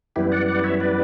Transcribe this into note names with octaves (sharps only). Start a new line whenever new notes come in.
F#2 E3 G3 B3 E4 G4
D5 F#5
D5 F#5
C#5 E5
B4 D5